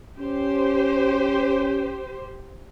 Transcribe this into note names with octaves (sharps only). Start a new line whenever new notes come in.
C#4 G4 C5